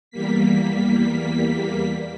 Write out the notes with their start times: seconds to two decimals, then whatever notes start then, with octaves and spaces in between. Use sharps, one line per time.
0.11 E2 G3 A#3 B6